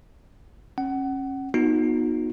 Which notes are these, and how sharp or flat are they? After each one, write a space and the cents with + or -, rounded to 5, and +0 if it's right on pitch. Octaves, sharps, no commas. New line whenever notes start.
C#4 -30 F#5 +25
B3 -20 D#4 +0 F#4 -35